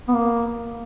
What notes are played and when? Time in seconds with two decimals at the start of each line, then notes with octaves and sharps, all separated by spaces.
0.08 B3
0.14 A#3